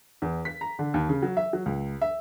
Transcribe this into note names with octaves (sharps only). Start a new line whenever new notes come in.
E2
B6
A#5
D3
D#2
C#3
F#3
E5
F#3
C#2
E5